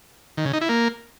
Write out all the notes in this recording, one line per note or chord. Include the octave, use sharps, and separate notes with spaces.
D#3
C#3
D#4
E4
A#3